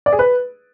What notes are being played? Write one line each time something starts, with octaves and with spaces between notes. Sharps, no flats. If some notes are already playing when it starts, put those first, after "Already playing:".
D5
G#4
B4